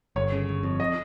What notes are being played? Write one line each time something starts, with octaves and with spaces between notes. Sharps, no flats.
G1 C#5
C#3
G1
F2
D#5